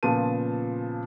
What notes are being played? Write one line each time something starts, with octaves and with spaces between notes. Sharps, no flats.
A#2 C#3 F3 B3 A5 D#7